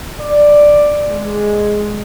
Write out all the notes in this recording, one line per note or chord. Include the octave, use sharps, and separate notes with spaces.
D5
G#3